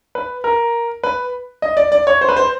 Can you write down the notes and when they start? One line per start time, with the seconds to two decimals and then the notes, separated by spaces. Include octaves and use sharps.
0.15 B4
0.44 A#4
1.04 B4
1.62 D#5
1.77 D5
1.92 D5
2.07 C#5
2.21 C5
2.29 B4
2.36 C5